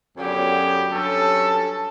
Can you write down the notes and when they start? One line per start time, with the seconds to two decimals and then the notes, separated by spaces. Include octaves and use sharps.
0.17 F#2 D3 F#3 B3 G4
0.93 G2 F#3 C#4 A4